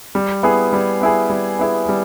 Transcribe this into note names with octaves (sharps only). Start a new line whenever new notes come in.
G3
B3 E4 G#4
G3
B3 E4 G#4
G3
B3 E4 G#4
G3